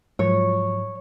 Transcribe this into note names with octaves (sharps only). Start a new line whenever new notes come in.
G#2 F3 F#3 C#5